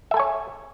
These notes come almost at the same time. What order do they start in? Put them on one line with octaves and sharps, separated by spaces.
E5 A4 G#5 C#5